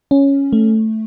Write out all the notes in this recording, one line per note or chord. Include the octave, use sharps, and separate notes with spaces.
C#4
A3